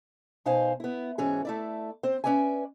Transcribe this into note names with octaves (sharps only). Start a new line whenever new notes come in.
B2 D#4 C5 F5 G#5
B3 E4
G#2 E3 C#4 F#4 G#4
A3 E4 D5
C4 C5
C#4 B4 D5 E5 G#5